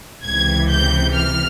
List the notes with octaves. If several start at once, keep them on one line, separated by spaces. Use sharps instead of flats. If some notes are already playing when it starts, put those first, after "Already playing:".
C#2 C3 E3 G#6
G6
F6